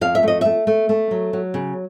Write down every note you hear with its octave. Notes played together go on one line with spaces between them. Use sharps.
F2 F5
E5
A3 D#5
A3 E5
A3
A3
F#3
F#3
C#3